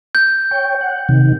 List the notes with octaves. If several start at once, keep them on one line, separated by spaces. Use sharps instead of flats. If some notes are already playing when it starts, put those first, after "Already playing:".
G6
C#5 G5
F#5
C3 D#3